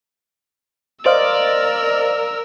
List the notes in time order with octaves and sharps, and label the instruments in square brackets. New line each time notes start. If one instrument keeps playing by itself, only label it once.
[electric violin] A#4 E6 [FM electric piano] C5 D#5 F5 [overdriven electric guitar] D5